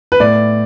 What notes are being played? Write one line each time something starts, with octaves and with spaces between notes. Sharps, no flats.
B4
A2 D5